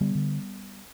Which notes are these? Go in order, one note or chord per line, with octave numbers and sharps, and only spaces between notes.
D3 G3 B3
D3